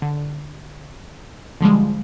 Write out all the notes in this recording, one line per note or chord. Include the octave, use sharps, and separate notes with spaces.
D3
D3 F3 G3 G#3